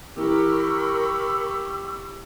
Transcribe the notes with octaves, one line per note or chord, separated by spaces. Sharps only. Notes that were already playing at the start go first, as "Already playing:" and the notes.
E3 G4 A#4 B5 C#6 E6